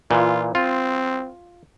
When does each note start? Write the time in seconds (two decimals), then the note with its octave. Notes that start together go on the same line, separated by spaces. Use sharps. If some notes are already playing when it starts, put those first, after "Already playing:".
0.11 A#2 E3 F4
0.55 C4 F4